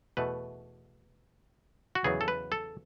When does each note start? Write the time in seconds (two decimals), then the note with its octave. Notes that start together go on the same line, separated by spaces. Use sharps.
0.17 E2 B2 A3 B4
1.95 F#4
2.04 E2 C#3 F#3 B3 G#4
2.21 A4
2.28 B4
2.52 A4